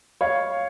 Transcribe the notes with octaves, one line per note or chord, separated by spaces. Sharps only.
C#5 F5